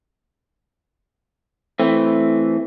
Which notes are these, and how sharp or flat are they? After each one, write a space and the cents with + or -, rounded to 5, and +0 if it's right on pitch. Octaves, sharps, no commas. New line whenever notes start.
E3 +0 A3 +0 C4 +5